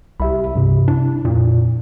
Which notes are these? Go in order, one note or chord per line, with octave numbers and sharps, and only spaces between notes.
C2 G4 E5 B5
G2 C3
D4 E4
F2 A#2